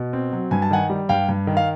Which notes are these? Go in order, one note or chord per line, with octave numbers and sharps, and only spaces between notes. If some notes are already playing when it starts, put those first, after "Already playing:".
Already playing: B2
C4
F#3
G2 G#5
A5
D#3 F#5 G#5
G3
G2 F5 G5
G2
D#3
F5